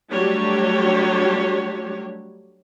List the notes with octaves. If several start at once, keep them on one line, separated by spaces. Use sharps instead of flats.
F#3 G3 A3 D4 G4 C#5